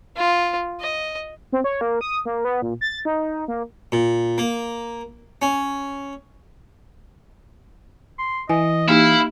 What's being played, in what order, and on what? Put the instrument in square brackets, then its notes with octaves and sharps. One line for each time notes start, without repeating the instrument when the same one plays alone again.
[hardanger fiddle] F4
D#5
[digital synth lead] C4
C#5
A#3
D#6
A#3
B3
A#2
A6
D#4
A#3
[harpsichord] A#2
A#3
C#4
[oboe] C6
[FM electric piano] E3 [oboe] D#5 [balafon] G#5
[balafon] A#3 D#4 G4 [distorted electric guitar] E4 [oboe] F5